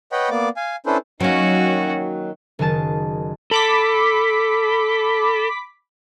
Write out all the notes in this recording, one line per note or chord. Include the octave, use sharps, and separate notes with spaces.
B4 C#5 D#5 F#5 G5 B5
A#3 B3 D5 D6
F5 G#5
C#4 D4 E4 A4 B4 C5
D#3 F#3 A#3 C#4 F#4
F#1 D#3 G#4 A5 A6
A4 B5 D6 B6